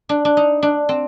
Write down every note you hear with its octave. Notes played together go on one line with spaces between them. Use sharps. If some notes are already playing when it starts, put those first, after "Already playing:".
D4
D4
D#4
D4
C4